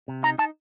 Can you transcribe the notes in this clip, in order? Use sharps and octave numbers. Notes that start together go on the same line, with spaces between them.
C3
D#4 A#5
D#4 A5